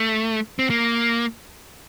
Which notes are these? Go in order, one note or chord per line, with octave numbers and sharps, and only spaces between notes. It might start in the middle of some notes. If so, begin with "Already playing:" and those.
Already playing: A3
C4
A#3